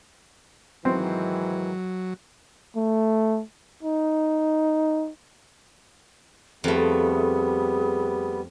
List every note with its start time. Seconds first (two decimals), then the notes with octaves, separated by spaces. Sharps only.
0.85 G#2 D#3 E3 F#3 C4
2.76 A3
3.83 D#4
6.64 F2 G3 A3 B3 G#4